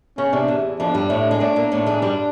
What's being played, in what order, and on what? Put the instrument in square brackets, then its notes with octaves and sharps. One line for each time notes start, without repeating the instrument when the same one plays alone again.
[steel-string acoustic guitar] C#3 [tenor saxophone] C#4
[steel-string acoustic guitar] C3 [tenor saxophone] D4
[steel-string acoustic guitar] E2 E3
[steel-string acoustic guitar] F2 F3 [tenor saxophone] D4
[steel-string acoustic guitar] G2 G3
A2 A3
G#3
[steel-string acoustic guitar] A2 A3 [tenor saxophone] D4
[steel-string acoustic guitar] A#2 A#3
A2 A3
G#2 G#3
G2 G3